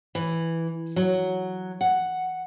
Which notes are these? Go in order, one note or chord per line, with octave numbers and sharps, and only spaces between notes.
E3
F#3
F#5